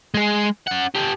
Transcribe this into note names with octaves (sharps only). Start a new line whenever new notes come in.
G#3 G#4
C#4 F#5
G4 A4